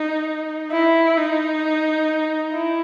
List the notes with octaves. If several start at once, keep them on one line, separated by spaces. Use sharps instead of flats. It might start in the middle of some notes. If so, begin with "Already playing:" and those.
Already playing: D#4
E4
D#4
E4